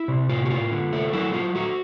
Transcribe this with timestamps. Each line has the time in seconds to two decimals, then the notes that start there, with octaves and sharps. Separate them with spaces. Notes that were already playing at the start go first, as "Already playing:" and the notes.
Already playing: E4
0.08 C3
0.29 A2 F4
0.45 F#4
0.50 A2 F4
0.71 D3
0.93 A3
1.13 F#3 E4
1.34 F#3 F4
1.55 A3 F#4